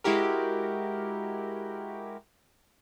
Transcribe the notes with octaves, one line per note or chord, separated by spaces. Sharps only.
G#3 E4 F#4 G4 A#4